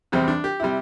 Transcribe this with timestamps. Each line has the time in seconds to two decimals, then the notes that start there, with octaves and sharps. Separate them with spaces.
0.12 E2 C3 G3 C4
0.28 D4
0.44 G4
0.60 C3 G3 E4